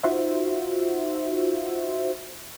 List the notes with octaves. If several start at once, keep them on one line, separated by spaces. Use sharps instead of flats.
D#4 F4 F#4 C5 E5